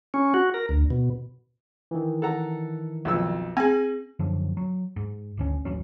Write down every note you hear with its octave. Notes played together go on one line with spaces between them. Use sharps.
C#4
F#4
A#4
D2
B2
D#3 E3
A4 F#5 A#5
B1 F2 E6
C4 G#4 G#5
F#2 D3 F3 F#3
F#3
G#2
G#1 D2 C#4
D#1 A1 F#3 C#4